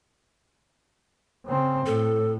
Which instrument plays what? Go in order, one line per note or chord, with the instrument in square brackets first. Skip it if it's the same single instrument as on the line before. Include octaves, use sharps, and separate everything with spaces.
[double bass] C#3 C4
[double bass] A2 [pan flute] A4